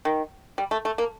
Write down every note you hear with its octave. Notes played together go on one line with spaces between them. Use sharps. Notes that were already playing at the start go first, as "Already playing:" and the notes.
D#3
G3
A3
A3
A#3